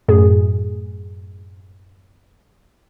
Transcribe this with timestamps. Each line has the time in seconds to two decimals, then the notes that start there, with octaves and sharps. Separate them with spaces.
0.08 F#2 A2 G#4